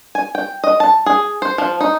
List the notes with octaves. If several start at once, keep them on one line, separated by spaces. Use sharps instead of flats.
G#5
G5
D#5
A5
G#4
C5
F3
D#4